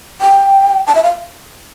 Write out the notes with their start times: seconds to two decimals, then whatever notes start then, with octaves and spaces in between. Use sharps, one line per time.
0.21 G5
0.87 A5
0.95 E5
1.04 F5